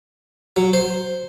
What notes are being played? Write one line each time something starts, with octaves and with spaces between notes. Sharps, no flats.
F#3
C5